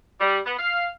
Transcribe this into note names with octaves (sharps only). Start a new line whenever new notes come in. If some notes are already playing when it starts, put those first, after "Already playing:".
G3
B3
F5